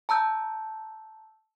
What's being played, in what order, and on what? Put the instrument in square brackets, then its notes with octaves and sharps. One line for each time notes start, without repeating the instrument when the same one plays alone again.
[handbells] A5 A#5 E6 G6